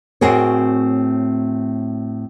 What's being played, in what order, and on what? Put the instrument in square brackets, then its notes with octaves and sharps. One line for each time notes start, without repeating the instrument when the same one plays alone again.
[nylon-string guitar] A2 C4 F#4 G#4 A#4 C#5